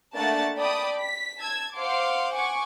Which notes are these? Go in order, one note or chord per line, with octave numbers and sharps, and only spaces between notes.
A3 A#3 D4 F#5 A5 A6
D5 G5 A5 B5 D6 D#6
B6
A5 E6 G#6
C5 F5 F#5 C6 D6
F#5 G#5 C#6 D6